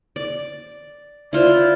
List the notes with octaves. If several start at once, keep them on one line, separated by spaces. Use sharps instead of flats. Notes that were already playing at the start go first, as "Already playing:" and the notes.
D5
E4 F4 C5 D5